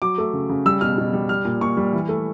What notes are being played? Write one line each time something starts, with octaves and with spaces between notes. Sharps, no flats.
F#3 D6
A3
C#3
C#3
G3 E6
B2 F6
B2
G3
G3 F6
A#2
A#2 C#6
G3
E3
A3